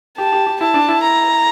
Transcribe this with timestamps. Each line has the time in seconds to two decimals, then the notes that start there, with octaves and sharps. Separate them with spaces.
0.18 G4 A5
0.32 G4
0.47 G4
0.61 E4 A5
0.74 D4
0.88 E4
1.03 A#5